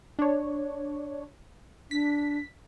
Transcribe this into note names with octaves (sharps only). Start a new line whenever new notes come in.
D4 C#5
D4 B6